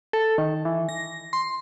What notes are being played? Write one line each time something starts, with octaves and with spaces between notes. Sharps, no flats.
A4
D#3
E3
A#6
C6